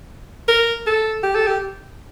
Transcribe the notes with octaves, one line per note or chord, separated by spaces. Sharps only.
A#4
A4
G4
A4
G4